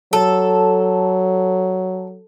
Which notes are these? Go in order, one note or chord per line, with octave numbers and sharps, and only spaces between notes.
F#3 A4